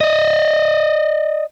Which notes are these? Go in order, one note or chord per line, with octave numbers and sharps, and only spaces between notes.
D5 D#5